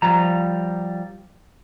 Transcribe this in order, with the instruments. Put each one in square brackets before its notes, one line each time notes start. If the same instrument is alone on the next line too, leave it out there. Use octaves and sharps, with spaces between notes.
[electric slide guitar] F3 G3 A#5